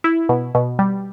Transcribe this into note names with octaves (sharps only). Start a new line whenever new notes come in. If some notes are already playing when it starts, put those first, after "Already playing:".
E4
B2
B2
G3